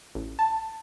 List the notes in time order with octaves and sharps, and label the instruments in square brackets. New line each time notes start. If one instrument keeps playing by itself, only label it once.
[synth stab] A1
A5